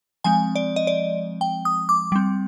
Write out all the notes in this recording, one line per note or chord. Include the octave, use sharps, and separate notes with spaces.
F3 G#3 C4 G#5
D5
D#5
D5
G5
D#6
D6
G3 C4